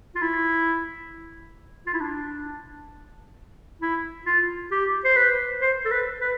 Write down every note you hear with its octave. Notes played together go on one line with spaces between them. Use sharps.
F4
E4
F4
E4
D4
E4
F4
G4
C5
B4
C5
A4
B4
B4